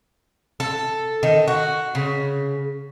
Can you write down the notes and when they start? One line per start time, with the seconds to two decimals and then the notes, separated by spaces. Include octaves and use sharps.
0.60 A4
1.23 D#3
1.48 F#4
1.95 C#3